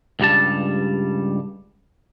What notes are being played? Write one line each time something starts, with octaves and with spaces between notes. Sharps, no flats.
C#2 G2 G3 A5